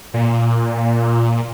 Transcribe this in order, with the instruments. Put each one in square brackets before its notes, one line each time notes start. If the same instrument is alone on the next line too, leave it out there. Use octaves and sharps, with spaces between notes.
[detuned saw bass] A#2